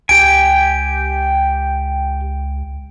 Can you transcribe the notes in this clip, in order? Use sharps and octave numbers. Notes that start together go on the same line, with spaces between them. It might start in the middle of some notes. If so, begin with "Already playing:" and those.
C#2 G4 G#5 D7